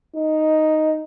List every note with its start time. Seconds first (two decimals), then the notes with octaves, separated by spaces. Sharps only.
0.15 D#4